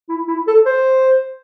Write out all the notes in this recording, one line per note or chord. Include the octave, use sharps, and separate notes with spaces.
E4
E4
A4
C5